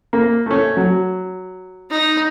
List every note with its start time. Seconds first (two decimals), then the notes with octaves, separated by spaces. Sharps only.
0.13 A#3
0.46 A3 C#4
0.77 F#3
1.90 D#4